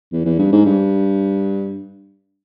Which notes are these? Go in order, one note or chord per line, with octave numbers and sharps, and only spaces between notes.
E2
E2
G2
G#2
G2